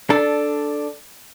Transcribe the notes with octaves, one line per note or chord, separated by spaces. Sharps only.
D4 A4